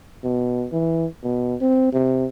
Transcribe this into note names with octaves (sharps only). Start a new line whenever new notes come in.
B2
E3
B2
C4
C3